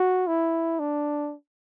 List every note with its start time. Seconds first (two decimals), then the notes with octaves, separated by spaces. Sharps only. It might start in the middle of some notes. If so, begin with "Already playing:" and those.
Already playing: F#4
0.27 E4
0.79 D4